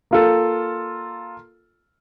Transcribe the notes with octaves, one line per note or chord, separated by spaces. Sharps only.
A#3 F4 A4